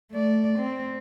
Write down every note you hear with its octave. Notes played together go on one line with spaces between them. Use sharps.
A3 D5
C4